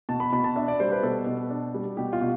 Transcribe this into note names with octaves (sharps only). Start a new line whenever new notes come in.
B2 A5
B5
B2 B5
A5
D4 E5
D5
G3 C5
B4
B2 A4
B2
D4
G3
B2 G4
F4
B2